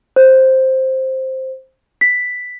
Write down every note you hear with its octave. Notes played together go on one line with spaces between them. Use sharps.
C5
B6